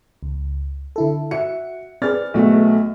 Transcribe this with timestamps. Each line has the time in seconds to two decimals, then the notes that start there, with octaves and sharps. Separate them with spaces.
0.23 C#2
0.96 D3 E4 A4
1.31 F#4 E5 F#5 C#7
2.02 C4 G#4 B4 D5 F6 A6
2.34 B1 A3 F#4